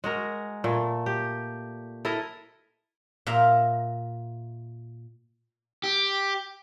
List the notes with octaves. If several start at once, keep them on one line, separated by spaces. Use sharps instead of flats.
G#3 F#4 A#4
A#2 A3
G4
E4 A4 A#4 D#5
A#2 E5 F5 A#5
G4